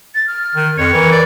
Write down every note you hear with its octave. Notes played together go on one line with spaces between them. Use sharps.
A6
F6
D#3
F2 C#5
E3 A#4
D5